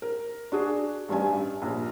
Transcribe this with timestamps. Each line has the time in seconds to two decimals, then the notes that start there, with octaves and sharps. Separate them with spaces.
0.02 A#4
0.52 D4 F#4 G#4
1.08 A1 G2 G3 G#5
1.62 A#1